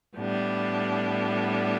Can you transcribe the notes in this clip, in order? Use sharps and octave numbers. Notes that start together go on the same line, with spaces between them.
A2 G3 B3 D4